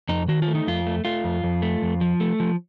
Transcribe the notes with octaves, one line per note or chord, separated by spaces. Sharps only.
F2 D#4
D#3 F#4
F4
A3
D#4
F2 F4
A3
A3 F4
F2
F2
A3
F2
F3
A3
F3